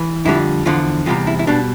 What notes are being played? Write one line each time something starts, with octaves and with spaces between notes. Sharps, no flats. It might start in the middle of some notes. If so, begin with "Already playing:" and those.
Already playing: E3
F2 D3 G3 E4
E2 D3 F3 F4
E2 C3 G3 F4
E4
E4
B2 G3 D4